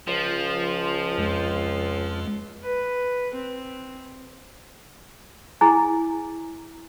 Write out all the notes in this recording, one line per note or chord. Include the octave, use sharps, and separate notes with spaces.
C#2 F3
F2 G#3
B4
C4
E4 G#4 G#5 A#5